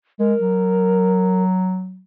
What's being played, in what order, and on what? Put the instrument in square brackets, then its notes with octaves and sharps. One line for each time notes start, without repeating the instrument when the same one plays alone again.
[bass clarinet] G#3 [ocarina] A#4
[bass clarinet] F#3